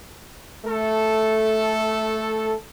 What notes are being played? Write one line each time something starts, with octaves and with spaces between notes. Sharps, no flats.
A3 A4